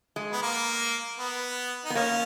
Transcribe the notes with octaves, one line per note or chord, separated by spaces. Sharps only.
G#3
B3
A#3
B3
D#4
B3
A#3 C#4